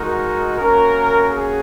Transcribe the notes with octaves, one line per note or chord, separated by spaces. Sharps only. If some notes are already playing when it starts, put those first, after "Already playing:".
Already playing: G#3 D#4 F#4 A#4
A#3 C#4 F#4 A#4
G#4